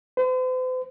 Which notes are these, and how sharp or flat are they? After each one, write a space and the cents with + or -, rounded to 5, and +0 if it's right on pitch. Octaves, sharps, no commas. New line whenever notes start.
C5 -45